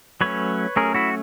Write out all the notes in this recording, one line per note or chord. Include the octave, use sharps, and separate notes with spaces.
F#3 A3 C#4 B4 C#5
F#3 A3 C#4 G#4 A#4
E4 F#4